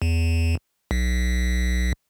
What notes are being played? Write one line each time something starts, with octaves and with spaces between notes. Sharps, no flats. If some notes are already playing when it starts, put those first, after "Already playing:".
E2
B1